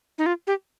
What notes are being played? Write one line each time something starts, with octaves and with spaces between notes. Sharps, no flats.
D#4
F4
G4